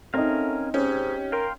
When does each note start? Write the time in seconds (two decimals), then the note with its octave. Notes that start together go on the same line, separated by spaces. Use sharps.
0.14 A3 C4 C#4 D#4 A#4 F5
0.74 G#2 C#4 G4
1.32 A#4 F5 G5 C6